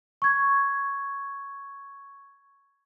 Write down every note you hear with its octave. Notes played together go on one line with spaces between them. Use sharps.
C#6 G#6